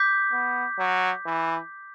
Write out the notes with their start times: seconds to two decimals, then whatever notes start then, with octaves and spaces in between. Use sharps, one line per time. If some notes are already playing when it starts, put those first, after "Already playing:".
Already playing: D6 G6 B6
0.32 B3
0.79 F#3
1.26 E3